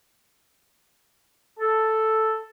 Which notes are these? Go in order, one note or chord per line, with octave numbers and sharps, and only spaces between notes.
A4